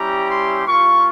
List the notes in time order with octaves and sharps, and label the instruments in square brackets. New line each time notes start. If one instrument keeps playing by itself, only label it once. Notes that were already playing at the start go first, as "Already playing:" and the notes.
Already playing: [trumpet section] G3 C#4 E4 G4 A#5
C6
A#3 F4 C#6